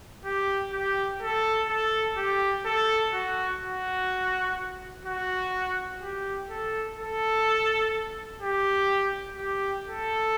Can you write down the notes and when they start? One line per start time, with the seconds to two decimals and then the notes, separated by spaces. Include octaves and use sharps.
0.25 G4
0.72 G4
1.22 A4
1.69 A4
2.17 G4
2.65 A4
3.13 F#4
3.62 F#4
5.06 F#4
6.02 G4
6.49 A4
6.98 A4
8.42 G4
9.38 G4
9.87 A4